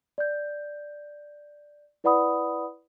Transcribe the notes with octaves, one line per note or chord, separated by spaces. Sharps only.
D5 G6
E4 B4 D5 F#5 B5 D#6